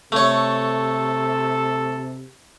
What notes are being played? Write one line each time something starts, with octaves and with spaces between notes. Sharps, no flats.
C3 A3 A4 C#5